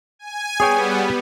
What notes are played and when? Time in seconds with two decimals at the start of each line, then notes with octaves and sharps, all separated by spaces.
0.19 G#5
0.60 G3 B3 G#4 C#5 G5